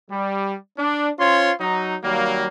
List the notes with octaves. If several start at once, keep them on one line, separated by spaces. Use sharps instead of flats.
G3
D4
C#4 F4 C5 C#5 C6
F#3 D#4
D#3 F#3 G3 A#3